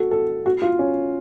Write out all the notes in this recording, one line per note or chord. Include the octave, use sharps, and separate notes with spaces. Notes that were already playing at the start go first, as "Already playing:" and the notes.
Already playing: F#4 A4
A4
F#4
F4
C#4